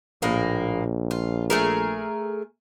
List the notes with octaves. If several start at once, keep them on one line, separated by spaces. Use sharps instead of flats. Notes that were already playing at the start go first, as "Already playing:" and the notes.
A#1 A2 A#3 G#4
F4
A3 G#4 A#4